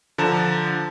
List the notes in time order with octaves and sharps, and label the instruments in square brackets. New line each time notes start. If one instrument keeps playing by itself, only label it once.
[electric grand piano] D3 F3 A5 A#5 E7